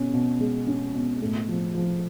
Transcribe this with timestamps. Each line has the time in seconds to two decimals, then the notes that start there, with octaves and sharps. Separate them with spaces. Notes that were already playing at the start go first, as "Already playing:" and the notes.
Already playing: B2 C#4
0.14 B2
0.41 G#3
0.67 C#4
0.94 B2
1.22 A2
1.49 F3
1.75 F3